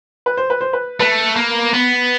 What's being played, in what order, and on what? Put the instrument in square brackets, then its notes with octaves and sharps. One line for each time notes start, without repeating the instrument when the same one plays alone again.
[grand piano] B4
C5
B4
C5
B4
[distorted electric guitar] A3 [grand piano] B4
[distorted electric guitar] A#3
B3